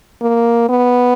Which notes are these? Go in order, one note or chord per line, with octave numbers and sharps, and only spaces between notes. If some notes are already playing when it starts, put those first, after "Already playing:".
A#3
B3